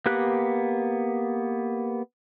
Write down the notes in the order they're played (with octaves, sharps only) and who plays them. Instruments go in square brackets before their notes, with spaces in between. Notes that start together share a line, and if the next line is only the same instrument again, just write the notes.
[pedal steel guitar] A#3 B3 G4 F#6